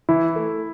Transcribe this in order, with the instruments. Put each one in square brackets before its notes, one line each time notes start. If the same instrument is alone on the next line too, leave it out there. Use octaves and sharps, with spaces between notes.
[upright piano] E3 [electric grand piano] E4
[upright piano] A3